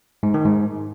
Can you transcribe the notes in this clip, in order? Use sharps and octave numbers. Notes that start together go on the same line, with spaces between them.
G#2
D#3
G#2